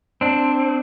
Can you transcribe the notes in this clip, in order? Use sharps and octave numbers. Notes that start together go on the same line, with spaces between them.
C4 D4